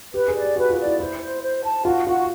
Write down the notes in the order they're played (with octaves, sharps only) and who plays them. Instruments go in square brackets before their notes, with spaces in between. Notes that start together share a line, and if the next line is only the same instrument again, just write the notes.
[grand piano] G4 [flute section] B4
[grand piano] G#4
[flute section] D5
[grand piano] G4
[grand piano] F#4 [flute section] B4
[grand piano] F4
[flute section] D5
[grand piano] E4
[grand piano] E4 [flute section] C5
[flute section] C5
C5
A5
[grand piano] F4 [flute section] F#4
[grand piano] F4 [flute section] F#4